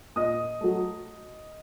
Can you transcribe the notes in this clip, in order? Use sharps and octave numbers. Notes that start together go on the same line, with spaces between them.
A#2 D#5 D#6
F#3 A3